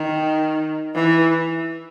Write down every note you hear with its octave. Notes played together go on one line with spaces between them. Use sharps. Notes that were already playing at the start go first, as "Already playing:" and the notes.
Already playing: D#3
E3